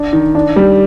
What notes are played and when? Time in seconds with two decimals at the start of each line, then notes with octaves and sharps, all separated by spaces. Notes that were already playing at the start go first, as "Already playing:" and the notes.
Already playing: D4
0.13 D#3
0.35 D4
0.56 G3